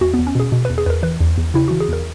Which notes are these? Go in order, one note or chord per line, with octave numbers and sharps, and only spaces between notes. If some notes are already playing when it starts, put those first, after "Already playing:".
E2 F#4
E2 B3
C#4
B2 G#4
B2
E2 B4
G#4
E2 A#4 B4
E3 B4
E2
E2
C#3 E4
E3 F#4
G#4
E2 A#4